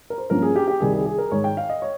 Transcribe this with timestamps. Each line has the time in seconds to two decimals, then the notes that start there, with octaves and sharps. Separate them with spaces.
0.10 A#4
0.18 C5
0.30 G2 F3 A#3 C#4 A#4
0.42 G#4
0.56 G4
0.68 G4
0.80 C2 C3 D#3 G3 G#4
0.93 G#4
1.06 G#4
1.18 A#4
1.32 G#2 D#3 G#3 C#5
1.44 G5
1.57 F5
1.70 D#5
1.82 C#5